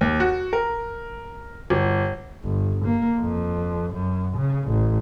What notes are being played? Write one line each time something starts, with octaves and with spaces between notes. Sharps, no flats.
D#2
F#4
A#4
G1
G1
A#3
F2
F#2
C#3
A1